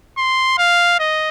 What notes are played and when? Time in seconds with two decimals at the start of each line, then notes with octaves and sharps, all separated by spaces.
0.18 C6
0.58 F5
0.99 D#5